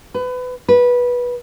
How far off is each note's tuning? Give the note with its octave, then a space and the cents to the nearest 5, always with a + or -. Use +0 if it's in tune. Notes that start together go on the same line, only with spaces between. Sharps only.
B4 +25
B4 -15